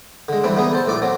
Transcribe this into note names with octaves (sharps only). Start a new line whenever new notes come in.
D3 G#3
E3 G3 A3 C4 D4
G3 A3 B3 D#4 G#4
A4 C5 A5
A#1 A2 D5 D6
F#3 A3 C4